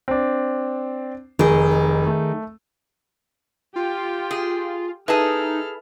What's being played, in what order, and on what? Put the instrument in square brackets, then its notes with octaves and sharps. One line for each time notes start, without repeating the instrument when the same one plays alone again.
[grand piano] C4 D4
[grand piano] F1 [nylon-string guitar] D#3 G#4
[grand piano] A3
[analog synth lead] F4 [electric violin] G4 G5
[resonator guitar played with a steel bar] G#4
[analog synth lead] D#4 [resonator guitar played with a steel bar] E4 G#4 [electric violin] A4 F6 [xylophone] B4 A5 D#6